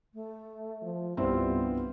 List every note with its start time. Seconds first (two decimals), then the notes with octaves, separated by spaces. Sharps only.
0.14 A3
0.82 F3
1.17 C2 G2 B3 C4 E4 F4 C5